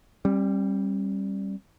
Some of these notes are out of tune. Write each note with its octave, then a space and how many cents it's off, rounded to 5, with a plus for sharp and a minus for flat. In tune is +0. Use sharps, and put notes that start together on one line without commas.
G3 +0 C#4 -45